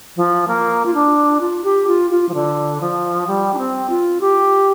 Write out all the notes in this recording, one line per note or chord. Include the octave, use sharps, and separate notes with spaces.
F3
A#3
F4
D4
F4
G4
F4
F4
F3
D3
F3
G3
D4
C4
F4
G4